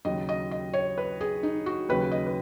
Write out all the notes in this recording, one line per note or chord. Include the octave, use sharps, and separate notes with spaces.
D#2 C#3 F#3 D#5
D#5
D#5
C#5
B4
G#4
D#4
F#4
D#2 C#3 F#3 B4
D#5
B4